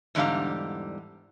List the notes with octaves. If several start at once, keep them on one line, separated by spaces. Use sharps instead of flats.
E2 G#2 D3 G3 F5 A#5